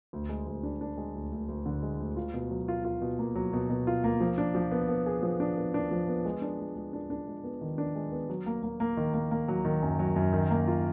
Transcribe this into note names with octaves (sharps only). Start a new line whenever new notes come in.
D2
G#3
D2
D4
D4
G#3
D2
D2
D2
D3
G#3
D2
F4
B2
F#3
F4
F4
B2
A#3
F#3
B2
B2
F4
A#3
F3
D4
F3
B3
B3
G#4
F3
D4
B3
D4
F3
B3
G#3
D4
G#3
G#3
D4
D4
G#3
B3
D#3
D4
G#3
B3
F#3
A#3
A#3
A#3
D#3
A#3
A#3
F#3
D#3
F#2
F#3
F#2
D#3
A#3
F4